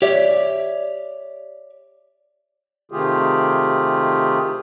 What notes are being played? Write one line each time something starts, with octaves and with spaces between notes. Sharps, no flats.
G4 C#5 D5 E5
C3 D#3 A3 F4 G4 G#4